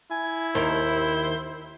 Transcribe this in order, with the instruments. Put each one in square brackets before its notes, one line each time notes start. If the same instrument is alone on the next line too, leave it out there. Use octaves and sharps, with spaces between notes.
[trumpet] E4 [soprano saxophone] G#5
[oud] D#2 D#3 [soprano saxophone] C5